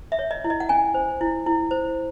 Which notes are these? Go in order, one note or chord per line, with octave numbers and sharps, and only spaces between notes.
E5
C#5
D#5
E4
D#5
F#5
C#4 G#5
C5
E4
E4
C5